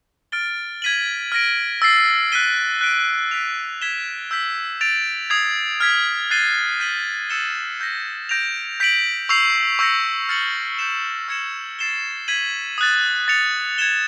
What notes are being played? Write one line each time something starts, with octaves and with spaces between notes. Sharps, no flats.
F6 A6 D7 G7
G#6 B6 D#7 F#7
F6 A#6 D7
E6 A6 C7
F#6 B6 D#7 G7
F#6 B6 D7 G7
F#6 B6 D7 F7
G#6 B6 E7 G7
E6 G6 B6
A6 D7 F7
D#6 G#6 C7 F7
F6 G#6 B6
F#6 A6 C7 D#7 G7
G6 B6 D#7 F#7
E6 A6 C#7 E7 G7
E6 G6 A#6
G6 A#6 D7 F7
G6 B6 D7 F#7
C#6 E6 G6 C7 F7
C#6 E6 G6 A#6 C#7
F6 A6 C#7 F#7
G6 C7 E7
E6 G#6 C#7 E7
A6 C7 E7 G7
G#6 B6 D#7 F#7
D#6 F#6 A6
A6 C#7 F7
G#6 C#7 E7 G7